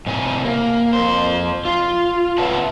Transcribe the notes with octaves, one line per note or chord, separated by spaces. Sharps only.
A2 C3 G#5
A#3
F2 C5
F4
C3 C#4 B4 E5 F#5 A5